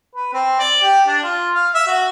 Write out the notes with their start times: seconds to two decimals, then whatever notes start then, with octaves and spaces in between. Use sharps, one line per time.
0.16 B4
0.33 C4
0.60 D5
0.82 G4
1.08 D4
1.23 F4
1.55 F5
1.74 E5
1.88 F#4